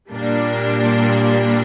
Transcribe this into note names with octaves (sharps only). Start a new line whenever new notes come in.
A#2 G3 A#3 D4